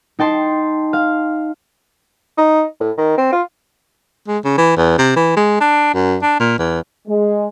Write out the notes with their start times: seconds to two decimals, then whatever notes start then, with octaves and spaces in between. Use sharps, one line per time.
0.19 D#4 G5 A5 C6
0.93 F5
2.38 D#4
2.81 A2
2.98 D#3
3.18 C4
3.32 F4
4.28 G#3
4.44 C#3
4.58 E3
4.77 E2
4.98 C3
5.16 E3
5.37 G#3
5.60 D4
5.94 F#2
6.22 D4
6.39 A#2
6.59 E2
7.08 G#3